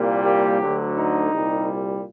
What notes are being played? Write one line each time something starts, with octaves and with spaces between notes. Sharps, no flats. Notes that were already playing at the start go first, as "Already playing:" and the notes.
Already playing: C2 A#2 G3 A#3
G4
D2 D3 F#3
D#4
C2 A#2 G3